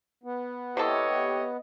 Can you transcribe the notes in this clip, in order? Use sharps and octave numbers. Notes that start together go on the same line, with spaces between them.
B3
C3 E3 G4 A4 C#5 D#5